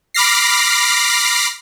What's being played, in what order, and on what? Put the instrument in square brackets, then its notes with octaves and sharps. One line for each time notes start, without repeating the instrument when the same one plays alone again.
[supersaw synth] B5 D6 F6 A#6 C7